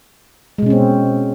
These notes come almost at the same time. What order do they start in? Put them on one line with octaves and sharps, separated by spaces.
G#3 B2 C#4 C4